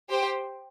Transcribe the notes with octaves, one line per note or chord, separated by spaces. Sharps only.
G4 C5 G5